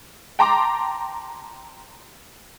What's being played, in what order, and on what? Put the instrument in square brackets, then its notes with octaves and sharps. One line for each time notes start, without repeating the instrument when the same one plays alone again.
[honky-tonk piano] G5 A5 A#5 C6 D6